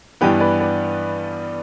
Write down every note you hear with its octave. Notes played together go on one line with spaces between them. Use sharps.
G2 E3 G3 B3 D4 G4 B4
B4 D5
B4 D5